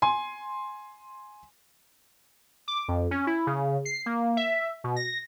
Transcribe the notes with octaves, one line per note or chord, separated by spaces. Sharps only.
G#5 C6
D6
F2
C#4
E4
C#3
C7
A#3
E5
B2
A#6